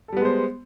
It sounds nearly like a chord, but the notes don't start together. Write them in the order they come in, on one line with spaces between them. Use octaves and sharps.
A4 G3 B3 G#3 C5